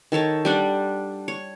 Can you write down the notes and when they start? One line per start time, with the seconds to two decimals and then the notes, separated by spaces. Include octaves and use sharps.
0.12 D#3 A4 C#5 A5
0.45 G3 D4 F#5
1.28 C#5